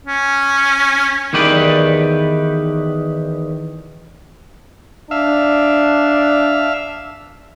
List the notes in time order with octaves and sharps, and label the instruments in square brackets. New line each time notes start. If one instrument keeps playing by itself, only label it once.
[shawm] C#4
[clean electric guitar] E2 D#3 G4 B4 D5
[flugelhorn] D4 [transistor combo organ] E5 F5